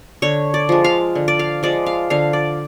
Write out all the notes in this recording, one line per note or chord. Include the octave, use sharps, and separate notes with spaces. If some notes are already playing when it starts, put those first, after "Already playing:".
D3 C#5
D5
F3 G#3
F5
D3
D5
F5
F3 G#3 D5
F5
D3 F5
D5